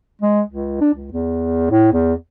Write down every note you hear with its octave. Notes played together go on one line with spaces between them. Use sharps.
G#3
C#2
D4
C#2
E2
A2
E2